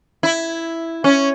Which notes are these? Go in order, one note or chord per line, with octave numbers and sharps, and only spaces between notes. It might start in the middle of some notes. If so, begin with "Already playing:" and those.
E4
C#4